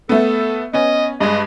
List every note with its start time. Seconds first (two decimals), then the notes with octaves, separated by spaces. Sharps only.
0.09 A3 B3 A4
0.73 B3 C#4 D#5
1.20 G2 G#3 D#5